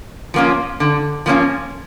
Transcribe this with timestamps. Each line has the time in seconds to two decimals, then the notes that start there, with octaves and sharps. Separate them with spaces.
0.34 F3 A#3 C#4 F4
0.80 D3
1.26 F3 A#3 C#4 F4